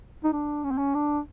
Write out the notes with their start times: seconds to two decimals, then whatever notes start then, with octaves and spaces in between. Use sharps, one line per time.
0.24 D#4
0.33 D4
0.64 C#4
0.71 C4
0.78 C#4
0.95 D4